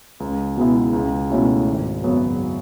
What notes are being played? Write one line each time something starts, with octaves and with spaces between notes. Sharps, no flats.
C#2
B2 G#3 B3 E4
C#2
B2 A3 C#4 E4
G#1
F#2 C#3 F#3 B3